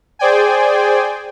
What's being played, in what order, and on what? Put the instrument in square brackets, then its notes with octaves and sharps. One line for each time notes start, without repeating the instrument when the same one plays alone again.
[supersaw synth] G#4 C5 D5 G5 G#5